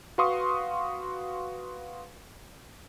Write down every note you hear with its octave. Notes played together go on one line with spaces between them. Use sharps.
F#4 B4 F5 C6 C#6 D#6